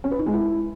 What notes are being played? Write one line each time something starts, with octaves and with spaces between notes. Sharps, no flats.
C#4
B4
D#4
G#3
E4